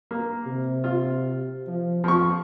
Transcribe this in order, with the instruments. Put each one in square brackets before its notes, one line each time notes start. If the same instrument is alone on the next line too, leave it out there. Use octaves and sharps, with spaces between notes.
[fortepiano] A#3
[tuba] C3
[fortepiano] F4
[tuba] F3
[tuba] F2 [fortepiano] F3 C#6